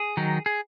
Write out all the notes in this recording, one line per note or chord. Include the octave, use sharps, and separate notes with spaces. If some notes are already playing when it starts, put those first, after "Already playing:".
Already playing: G#4
D#3 F#3 D#4
G#4